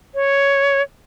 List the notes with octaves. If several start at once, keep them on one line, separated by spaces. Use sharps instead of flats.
C#5